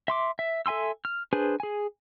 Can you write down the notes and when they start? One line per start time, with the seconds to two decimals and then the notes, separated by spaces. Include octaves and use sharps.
0.08 E5 C6 D6
0.39 E5
0.66 A4 E5 G#5 C6 E6
1.05 F6
1.33 D4 G#4 B4 C5 G#5
1.60 G#4 G#5